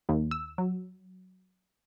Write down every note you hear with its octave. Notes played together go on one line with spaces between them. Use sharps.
D#2
E6
F#3